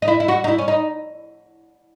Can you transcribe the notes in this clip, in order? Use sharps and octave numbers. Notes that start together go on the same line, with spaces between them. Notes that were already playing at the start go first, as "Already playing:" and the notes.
D#4
E4
E4
F#4
D#4
E4
C#4
D#4